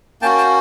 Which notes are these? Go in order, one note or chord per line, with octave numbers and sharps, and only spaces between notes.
A#3 C#4 F#4 G5 A5
G5 A5